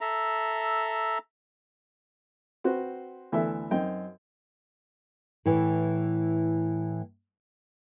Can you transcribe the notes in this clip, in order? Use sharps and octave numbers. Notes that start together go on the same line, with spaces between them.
A4 E5 A#5
C4 F#4 B4 C5
D2 E3 B3 A4 E5
F#2 C4 D#4 G5
A2 E3